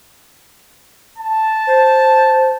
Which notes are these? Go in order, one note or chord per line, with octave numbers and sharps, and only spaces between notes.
A5
C5